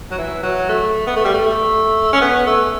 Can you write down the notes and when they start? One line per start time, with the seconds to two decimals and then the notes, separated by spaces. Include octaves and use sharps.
0.11 F#3
0.18 E3
0.43 F#3
0.69 A3
1.07 B3
1.16 A3
1.25 G3
1.34 A3
2.13 C#4
2.21 B3
2.47 A3